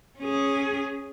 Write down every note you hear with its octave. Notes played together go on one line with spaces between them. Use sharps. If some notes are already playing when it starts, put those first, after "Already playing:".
C#4 G#4